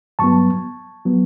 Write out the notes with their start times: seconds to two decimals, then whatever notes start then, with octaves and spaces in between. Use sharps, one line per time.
0.19 G2 F#3 B3 A5 C#6
1.05 F#3 B3